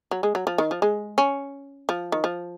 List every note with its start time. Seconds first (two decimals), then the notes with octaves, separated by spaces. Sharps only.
0.11 F#3
0.23 G#3
0.35 F#3
0.47 F3
0.58 D#3
0.71 F3
0.82 G#3
1.18 C#4
1.89 F3
2.12 D#3
2.24 F3